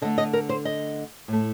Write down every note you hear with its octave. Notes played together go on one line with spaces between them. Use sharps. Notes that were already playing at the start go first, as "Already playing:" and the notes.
D3 A3 D#5
D#5
A#4
C5
D#5
A2 A3